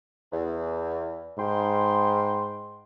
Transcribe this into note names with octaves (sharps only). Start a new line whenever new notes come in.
E2
G#2 G5 B5 C6